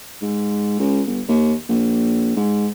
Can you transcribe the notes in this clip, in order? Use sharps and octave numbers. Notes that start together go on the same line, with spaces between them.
G#2
C#2
G1
D#2
A#1
G#2